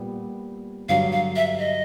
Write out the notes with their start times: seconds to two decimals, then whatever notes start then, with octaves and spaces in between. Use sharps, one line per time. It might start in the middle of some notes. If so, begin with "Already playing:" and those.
Already playing: A#2 G3 B3
0.89 G2 D3 F#3 F5
1.12 F5
1.36 E5
1.59 D#5